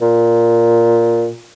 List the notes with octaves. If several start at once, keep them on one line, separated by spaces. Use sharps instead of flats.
A#2